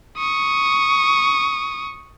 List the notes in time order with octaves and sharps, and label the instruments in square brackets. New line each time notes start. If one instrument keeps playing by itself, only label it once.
[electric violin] C#6 D#6